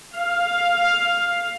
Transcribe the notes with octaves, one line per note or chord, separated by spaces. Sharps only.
F5